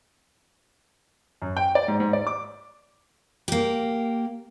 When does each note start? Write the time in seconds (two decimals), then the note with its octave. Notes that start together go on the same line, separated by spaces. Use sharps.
1.42 F#2
1.57 G5
1.75 D5
1.88 G#2
2.00 G#2
2.13 D5
2.27 D6
3.48 A#3 G4